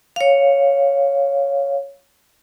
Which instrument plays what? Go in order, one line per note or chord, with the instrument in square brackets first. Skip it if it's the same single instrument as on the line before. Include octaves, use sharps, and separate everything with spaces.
[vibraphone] C#5 F5